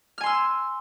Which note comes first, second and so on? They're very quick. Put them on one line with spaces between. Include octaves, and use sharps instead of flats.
F6 G#5 C6 E6